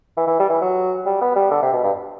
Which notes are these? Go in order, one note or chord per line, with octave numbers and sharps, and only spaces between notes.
E3
E3
G3
E3
F#3
G3
B3
G3
D3
C3
B2
G2